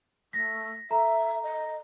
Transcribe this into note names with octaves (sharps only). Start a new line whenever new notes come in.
A3 A#6 B6
A4 E5 A#5
D#5